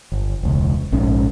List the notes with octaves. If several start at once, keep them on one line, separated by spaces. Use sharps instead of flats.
G1
E1 C#2
A#1 G#2 C#4